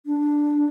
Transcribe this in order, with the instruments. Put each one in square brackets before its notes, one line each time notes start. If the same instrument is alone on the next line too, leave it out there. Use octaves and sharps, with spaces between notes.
[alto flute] D4